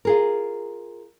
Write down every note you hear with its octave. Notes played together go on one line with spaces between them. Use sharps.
F4 G#4 A#4